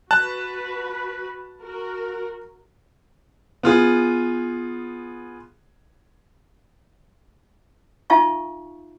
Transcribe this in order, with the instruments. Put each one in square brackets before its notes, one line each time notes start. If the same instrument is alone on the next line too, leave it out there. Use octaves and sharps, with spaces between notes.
[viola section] F#4 B4 [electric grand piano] A5 F#6
[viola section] F#4 A#4
[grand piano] B3 F4 G#4
[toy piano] D#4 F4 E5 F5 A5 C#6